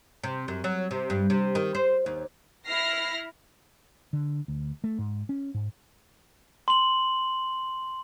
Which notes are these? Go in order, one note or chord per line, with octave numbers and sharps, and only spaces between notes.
C3
F#2
F#3
C3
G2
C3
D#3
C5
D#2
E4 F6 A#6 C7
D3
D2
A3
G#2
C#4
G#2
C6 F#7